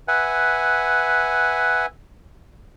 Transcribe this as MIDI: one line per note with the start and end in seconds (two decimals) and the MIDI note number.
0.08 1.86 71
0.08 1.86 76
0.08 1.86 78
0.08 1.86 80